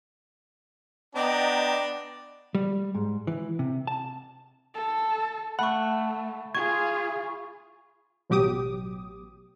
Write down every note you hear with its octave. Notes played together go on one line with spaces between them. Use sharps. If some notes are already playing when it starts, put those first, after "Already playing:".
B3 D4 D#5 G5 A#5
G3
G#2
E3
C3
A5
A4
A3 F#5 B5 C#6
F4 G#4 C#6 G#6
A1 B2 F#3 G4 D6 D#6